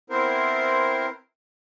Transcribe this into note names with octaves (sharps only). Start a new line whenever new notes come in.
B3 C4 E4 A#4 C5